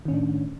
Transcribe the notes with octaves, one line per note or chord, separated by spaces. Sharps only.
A2 D#3 C#4 D4